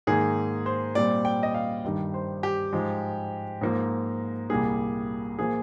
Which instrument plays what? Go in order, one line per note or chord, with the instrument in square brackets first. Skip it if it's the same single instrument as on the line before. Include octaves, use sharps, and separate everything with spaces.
[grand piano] G#2 D#3 A#3 G#4
C5
A#2 G3 C4 D5
G5
D#5
F5
G2 D#3 G3
C5
G4
G#2 F3 G#3
G#2 F3 A#3
C2 A#2 G3 A#3 G#4
A#2 F3 A#3 G#4